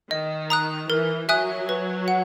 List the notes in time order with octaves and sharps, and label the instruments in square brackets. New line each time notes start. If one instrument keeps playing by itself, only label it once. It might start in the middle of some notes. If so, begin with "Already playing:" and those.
[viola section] D#3 [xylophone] D#5
[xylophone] A#5 D#6 F#6
[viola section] E3 [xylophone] A#4
[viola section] F#3 [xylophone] E5 G#5 D#6 F#6
[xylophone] B4
F#5